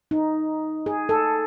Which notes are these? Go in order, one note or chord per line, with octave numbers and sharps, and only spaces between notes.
D#4
G#4
A4